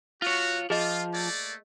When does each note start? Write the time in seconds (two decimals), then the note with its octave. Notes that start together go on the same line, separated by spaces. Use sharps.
0.22 F4 F#4 C#5
0.70 F3 F4 G#4 D#5
1.13 A3 A#3 D5